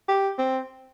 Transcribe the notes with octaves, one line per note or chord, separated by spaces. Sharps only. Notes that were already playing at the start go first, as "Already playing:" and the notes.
G4
C4